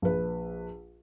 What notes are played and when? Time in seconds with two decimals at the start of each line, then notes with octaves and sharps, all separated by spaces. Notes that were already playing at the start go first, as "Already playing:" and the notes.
0.02 A#1 B4